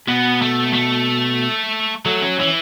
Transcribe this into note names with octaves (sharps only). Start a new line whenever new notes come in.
B2 B3
A3
A3
F#3 A3
C#4
E3 C#4